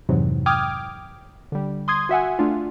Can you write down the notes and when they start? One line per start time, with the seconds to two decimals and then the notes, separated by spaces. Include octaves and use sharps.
0.09 F2 G#2 C3 E3 F#3
0.46 G5 D6 D#6 F6 G#6
1.52 D3 G3
1.88 C6 D#6 G#6
2.09 F#4 E5 F#5 G#5
2.39 A3 D4 F4